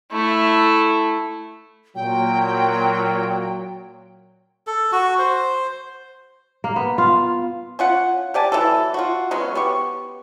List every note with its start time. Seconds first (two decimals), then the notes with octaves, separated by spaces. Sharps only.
0.12 A3 E4
1.96 A#2 F#3 G5
4.67 A4
4.92 F#4
5.19 C5
6.64 A#3
6.76 B3
6.98 F4
7.79 C#4 F4 F#5
8.34 G4 D5 G#5 A5
8.52 E3 F#3 A4
8.94 F4 F#4
9.31 F#3 G#3 B3 C#4
9.55 B3 G4 C#6